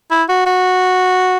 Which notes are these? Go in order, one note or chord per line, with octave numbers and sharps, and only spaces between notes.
E4
F#4
F#4